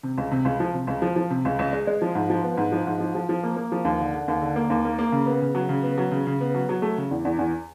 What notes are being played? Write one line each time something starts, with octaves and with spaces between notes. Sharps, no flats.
C3
C#2
C3
C#2
F3
C3
C#2
F3
F3
C3
C#2
C#2
G#3
G#3
F3
G#2
F3
B3
G#2
F3
G#2
F3
F3
F3
A#3
A#3
F3
D#2
D3
D3
D#2
D3
A#3
D#2
A#3
A#3
C#3
B3
C#3
F#3
C#3
B3
F#3
C#3
C#3
B3
F#3
F#3
A3
C#3
E2
E2
E2